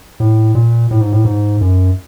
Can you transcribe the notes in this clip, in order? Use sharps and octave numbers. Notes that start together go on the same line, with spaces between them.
A2
A#2
A2
G#2
A2
G#2
F#2